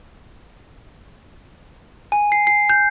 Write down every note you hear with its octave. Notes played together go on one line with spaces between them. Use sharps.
G#5
C7
C7
G6